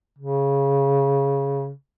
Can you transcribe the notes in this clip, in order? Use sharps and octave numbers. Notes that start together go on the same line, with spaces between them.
C#3